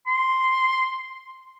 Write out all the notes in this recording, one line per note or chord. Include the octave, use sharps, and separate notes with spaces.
C6